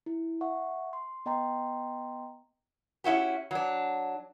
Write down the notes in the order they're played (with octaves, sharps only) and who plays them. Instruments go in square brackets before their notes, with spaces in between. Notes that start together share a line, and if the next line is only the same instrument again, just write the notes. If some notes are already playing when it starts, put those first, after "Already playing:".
[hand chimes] E4
E5 F#5 C#6
C6
B3 D#5 G5 A#5 C6
[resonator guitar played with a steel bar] C#4 E4 F#4 G4
F#3 D4